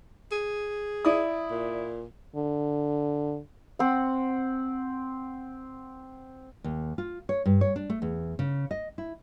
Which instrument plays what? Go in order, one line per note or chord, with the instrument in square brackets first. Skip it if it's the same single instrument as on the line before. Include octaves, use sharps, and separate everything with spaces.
[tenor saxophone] G#4
[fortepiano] E4 D5 D#6
[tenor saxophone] A#2
[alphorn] D3
[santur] C4 F#5
[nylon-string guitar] D#2
F4
C#5
G2
C#5
D4
A3
E2
C#3
D#5
E4